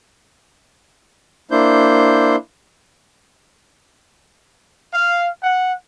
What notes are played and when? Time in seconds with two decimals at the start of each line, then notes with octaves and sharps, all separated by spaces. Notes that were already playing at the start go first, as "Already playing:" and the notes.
1.51 A#3 D4 E4 C5 G6
4.93 F5
5.42 F#5